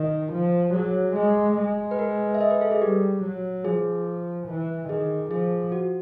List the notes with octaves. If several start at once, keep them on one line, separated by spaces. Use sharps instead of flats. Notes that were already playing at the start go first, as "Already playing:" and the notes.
Already playing: D#3
F3
F#3 G#4
G#3 G#4
G#3
B4
A#4
E5
D#5
B4
A4
G#4
G3 G4
F#3
F3 G#4
E3
D#3 G#4
F3 G#4
F#4